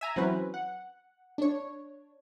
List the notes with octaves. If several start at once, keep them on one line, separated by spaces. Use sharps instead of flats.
E5 G#5 A#5
E3 F#3 C4 C#4 B4
F#5
D4 C#5